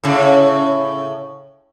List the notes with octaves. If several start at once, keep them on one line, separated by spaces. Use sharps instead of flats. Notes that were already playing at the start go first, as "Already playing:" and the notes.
A2 C#3